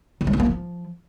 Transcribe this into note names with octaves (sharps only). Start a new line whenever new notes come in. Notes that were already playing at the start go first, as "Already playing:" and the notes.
D3
G#3
C#4
A#3
F3